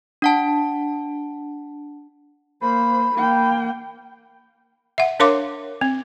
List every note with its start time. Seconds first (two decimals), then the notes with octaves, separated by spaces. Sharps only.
0.22 D4 F#5 A5
2.61 A#3 C5 B5
3.13 A#3 G5
4.98 E5 F#5
5.20 D4 A#4 C#5 F5 C6 D6
5.81 C4